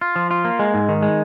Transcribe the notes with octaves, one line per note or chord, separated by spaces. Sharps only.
F4
F3
F4
A#3
G#3
G#2
D#3
G#3